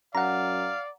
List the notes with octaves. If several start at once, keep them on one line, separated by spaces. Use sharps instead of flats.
F#2 D5 F5 F#5 A#5